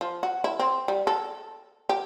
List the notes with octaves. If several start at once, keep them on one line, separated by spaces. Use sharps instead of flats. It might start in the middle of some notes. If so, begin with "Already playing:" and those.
F3
F#4
E4
C4
G3
A4
G4